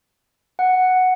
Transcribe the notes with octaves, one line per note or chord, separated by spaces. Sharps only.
F#5